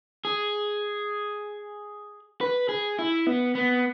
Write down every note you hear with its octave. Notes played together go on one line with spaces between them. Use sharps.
G#4
B4
G#4
E4
B3
B3